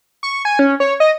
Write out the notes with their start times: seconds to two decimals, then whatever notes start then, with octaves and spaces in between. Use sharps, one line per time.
0.23 C#6
0.45 G#5
0.59 C#4
0.80 C#5
1.00 D#5